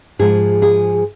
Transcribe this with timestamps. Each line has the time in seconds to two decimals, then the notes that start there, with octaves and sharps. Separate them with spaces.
0.19 G#2 F3 G#4
0.62 G#4